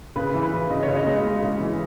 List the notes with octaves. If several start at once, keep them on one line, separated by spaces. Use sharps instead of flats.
C#3 B4
E3
B4
E3
C#3 D#5
C#5
C#3
D#5
G#3
G#3
C#3
E3